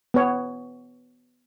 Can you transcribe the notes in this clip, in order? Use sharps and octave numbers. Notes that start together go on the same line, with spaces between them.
B3 C#5